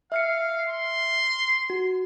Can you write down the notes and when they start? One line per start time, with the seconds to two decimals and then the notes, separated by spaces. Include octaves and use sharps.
0.12 E5 F5 F6 C#7
0.69 C6
1.70 F#4